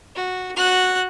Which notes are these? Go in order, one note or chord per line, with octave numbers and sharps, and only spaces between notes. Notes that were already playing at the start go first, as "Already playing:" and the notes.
F#4
F#4 F#6